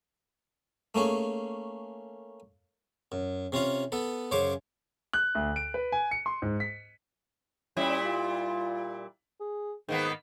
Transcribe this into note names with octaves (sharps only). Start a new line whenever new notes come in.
A3 A#3 C#4 G#4
F#2
C3 C#4 F4 F5
B3 A4 B4
F#2 C#3 C5 C#5 D6
F#6
D2
D7
B4
G#5
C#7
C6
G#2
B6
A#2 G3 C#4 E4
F4
G#4
G#2 D#3 A#3 B3